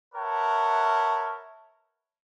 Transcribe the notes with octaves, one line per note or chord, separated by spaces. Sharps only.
A#4 B4 C#5 E5 F#5 A5